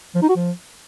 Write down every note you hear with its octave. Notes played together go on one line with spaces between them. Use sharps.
F3
D#4
F#4
F3